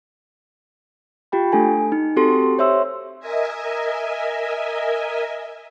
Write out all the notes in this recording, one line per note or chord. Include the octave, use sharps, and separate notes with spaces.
F4 G4 G5 B5
A3 D4 A4 G#5
D#4
C4 F#4 G4 A4 C6
G4
C5 C#5 E5 C6 E6
A#4 D#5 E5 G#5